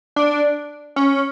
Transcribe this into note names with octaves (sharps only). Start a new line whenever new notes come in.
D4
C#4